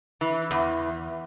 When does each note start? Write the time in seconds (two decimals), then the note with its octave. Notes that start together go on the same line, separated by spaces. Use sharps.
0.21 E3
0.51 E2